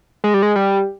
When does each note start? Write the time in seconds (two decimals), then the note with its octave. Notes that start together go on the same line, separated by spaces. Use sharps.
0.24 G#3
0.34 G3
0.43 G#3
0.56 G3